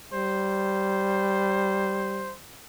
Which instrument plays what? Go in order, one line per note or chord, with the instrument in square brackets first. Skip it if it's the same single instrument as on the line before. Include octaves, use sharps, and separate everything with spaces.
[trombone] G3 [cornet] C5